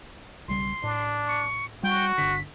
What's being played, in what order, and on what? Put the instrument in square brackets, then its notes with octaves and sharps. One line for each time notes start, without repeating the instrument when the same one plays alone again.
[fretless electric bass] B1 C#3 G3 [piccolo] C6
[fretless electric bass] A2 [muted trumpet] D4
[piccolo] C#6
[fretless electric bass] G3 [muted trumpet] F#4 [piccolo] G5
[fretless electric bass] G1 D3 [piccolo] B6